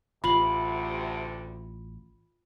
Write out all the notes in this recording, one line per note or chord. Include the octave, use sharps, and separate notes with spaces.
A1 D2 C3 F4 B5 F#7